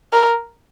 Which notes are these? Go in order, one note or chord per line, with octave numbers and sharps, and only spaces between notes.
A#4